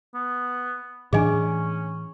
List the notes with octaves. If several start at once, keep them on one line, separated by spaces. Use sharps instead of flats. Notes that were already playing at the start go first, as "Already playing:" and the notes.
B3
A2 E3 C#4 D4 G#4 D#5 G#5